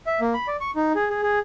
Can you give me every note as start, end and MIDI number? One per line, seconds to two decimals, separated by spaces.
0.07 0.20 76
0.21 0.34 58
0.34 0.47 83
0.48 0.57 74
0.61 0.71 85
0.76 0.93 63
0.95 1.09 68
1.10 1.22 68
1.23 1.39 68